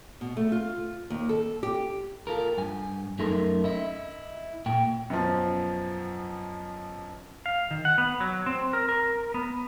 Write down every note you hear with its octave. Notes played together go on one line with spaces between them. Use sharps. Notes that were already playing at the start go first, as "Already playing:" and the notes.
B2
A3
F4
D#2
A4
G4
F4 A4 A#4
G2 G#5
F#2 A3 D#4 A4 A#4 C6
E4 D#5 E5
A#2 G5
F#2 B2 F3
F5
D#3
F#5
B3
F#3
C4
A#4
A#4
B3